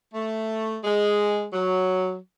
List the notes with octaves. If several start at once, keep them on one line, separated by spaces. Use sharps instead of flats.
A3
G#3
F#3